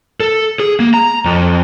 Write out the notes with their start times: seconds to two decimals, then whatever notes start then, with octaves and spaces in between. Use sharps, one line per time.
0.20 A4
0.60 G#4
0.80 A#3
0.94 A#5
1.25 F2